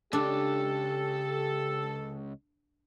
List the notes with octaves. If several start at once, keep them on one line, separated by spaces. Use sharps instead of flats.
C#2 C#3 D4 G4 A4